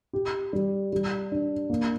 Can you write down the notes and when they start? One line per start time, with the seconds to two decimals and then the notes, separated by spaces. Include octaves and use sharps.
0.13 G4
0.53 G3
0.93 G3
1.32 D4
1.70 A#3